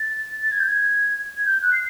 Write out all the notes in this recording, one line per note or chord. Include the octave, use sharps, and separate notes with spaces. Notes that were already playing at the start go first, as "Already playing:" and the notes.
Already playing: A6
A6
G#6
G6
G#6
G#6
G6
F#6
C7